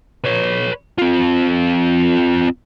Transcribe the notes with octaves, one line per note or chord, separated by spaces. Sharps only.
B4 C#5
C4 F4